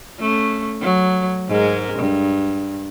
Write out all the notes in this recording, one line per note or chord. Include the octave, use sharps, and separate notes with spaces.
A3 C#4
F#3
G#2 G#3 A#4
G2